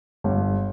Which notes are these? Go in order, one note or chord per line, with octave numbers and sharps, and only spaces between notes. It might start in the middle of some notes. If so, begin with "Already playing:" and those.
G1